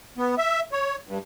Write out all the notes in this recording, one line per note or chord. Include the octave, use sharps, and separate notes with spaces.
B3
E5
C#5
G2